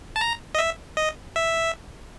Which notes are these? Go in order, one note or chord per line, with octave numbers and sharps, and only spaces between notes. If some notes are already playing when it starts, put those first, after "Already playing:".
A5
A#5
D#5
E5
D#5
E5